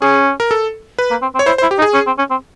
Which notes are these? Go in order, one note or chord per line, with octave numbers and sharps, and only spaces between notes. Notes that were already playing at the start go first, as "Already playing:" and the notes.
C#4 G#4
A#4
A4
B4
A#3
C4
C4
C#5
E4 C5
C5
E4
G4
D#4
G#4
C#4
C4
C#4
C4